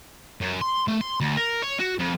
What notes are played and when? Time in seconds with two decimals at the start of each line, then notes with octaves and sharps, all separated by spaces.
0.41 F#2
0.61 C6
0.88 A3
1.01 C6
1.21 D2
1.37 A#4
1.62 C#5
1.80 F#4
1.99 F2